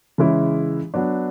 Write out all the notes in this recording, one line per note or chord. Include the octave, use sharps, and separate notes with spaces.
C#3 E3 G#3 C#4 E4
F#3 B3 D4